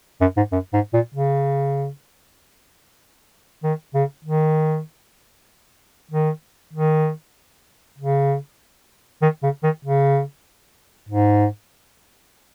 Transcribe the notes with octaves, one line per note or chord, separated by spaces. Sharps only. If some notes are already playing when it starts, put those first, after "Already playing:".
F#2
G#2
F#2
G#2
A#2
C#3
D#3
C#3
D#3
D#3
D#3
C#3
D#3
C#3
D#3
C#3
G#2